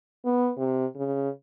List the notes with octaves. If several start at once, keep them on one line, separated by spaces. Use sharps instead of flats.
B3
C3
C#3